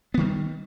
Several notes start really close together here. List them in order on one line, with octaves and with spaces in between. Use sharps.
B3 D#3 G3